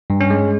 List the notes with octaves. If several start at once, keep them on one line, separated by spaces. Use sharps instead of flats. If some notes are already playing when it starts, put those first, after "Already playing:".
G2
C#4
G#3